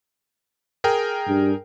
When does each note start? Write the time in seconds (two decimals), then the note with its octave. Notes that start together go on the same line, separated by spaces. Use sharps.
0.84 G#4 A#4 G5
1.28 G2